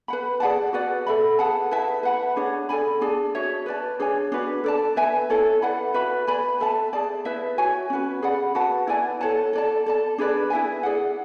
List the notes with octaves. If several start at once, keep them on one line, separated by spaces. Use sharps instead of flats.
B4 F#5 B5
G#4 D5 F#5 A5
F#4 B4 D5 F#5
A4 E5 B5
G#4 B4 F#5 A5
E4 B4 E5 A5
B4 F#5 B5
D4 G#4 C#5
A4 D5 G#5 B5
D4 G#4 D5 A5
F#4 C#5 E5
B4 D5 A5
D4 G#4 C#5 G#5
D4 F#4 B4
A4 D5 A5
B4 E5 G#5
E4 A4 C#5
B4 D5 F#5 B5
F#4 B4 E5 B5
B4 D5 G#5 B5
A4 E5 A5
G#4 D5 A5
E4 B4 E5
F#4 C#5 G#5
C#4 F#4 B4
G#4 D5 F#5 B5
F#4 B4 F#5 A5
E4 B4 D5 G#5
A4 C#5 F#5 A5
A4 D5 A5
A4 D5 A5
D4 G#4 B4 D5
E4 B4 E5 G#5
G#4 D5 F#5